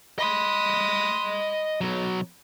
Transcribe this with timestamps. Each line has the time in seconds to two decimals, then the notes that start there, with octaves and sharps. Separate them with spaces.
0.19 D#5 B5 C6 D#6
1.81 B1 F#3